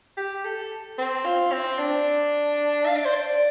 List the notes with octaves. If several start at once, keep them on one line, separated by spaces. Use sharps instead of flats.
G4
A4
C4
F4
C4
D4
F5
D5
C5
D5